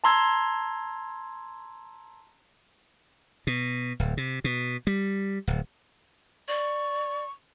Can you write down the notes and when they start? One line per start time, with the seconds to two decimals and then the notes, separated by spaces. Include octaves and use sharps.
0.04 A5 A#5 C6 E6 G#6
3.47 B2
4.00 D1
4.17 C3
4.44 B2
4.87 G3
5.47 D1
6.48 D5 C#6